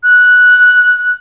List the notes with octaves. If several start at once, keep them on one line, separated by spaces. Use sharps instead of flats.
F#6